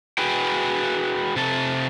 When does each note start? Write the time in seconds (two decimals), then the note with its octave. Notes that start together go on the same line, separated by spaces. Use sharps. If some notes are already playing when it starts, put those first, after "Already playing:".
0.18 F#4 G#4 B4 G5
1.36 C3 A4